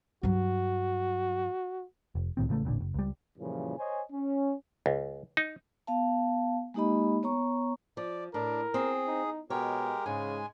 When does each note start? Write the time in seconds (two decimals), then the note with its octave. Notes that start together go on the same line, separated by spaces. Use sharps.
0.23 G2 F#3 F#4
2.15 F1
2.37 C#2 A2 D#3 C4
2.49 A1 C#3 E3 A3
2.64 E1 A1 A#2 D3
2.81 F#1
2.94 C#2 G3
3.38 F#2 A#2 C#3 E3 F3 G3
3.78 C5 C#5 D#5 G#5
4.11 C#4
4.86 C#2
5.37 D#4
5.87 B3 F5 A5
6.74 G#3 A#3 D#4 G4 D#5 B5
7.23 B3 C#5 A#5 C#6
7.97 F3 D5
8.34 A2 D4 A#4
8.74 C4 G#4
9.08 D#4
9.50 B2 G#3 G4 A#4 C#5
10.06 G#2 C#3 G#3 G#5